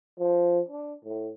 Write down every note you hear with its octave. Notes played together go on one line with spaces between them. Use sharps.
F3
D4
A2